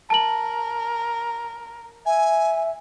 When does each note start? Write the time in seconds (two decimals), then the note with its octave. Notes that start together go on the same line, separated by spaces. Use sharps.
0.10 A#4 A5 F#7
2.06 E5 G#5